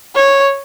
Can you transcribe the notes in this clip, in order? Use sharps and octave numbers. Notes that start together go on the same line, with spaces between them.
C#5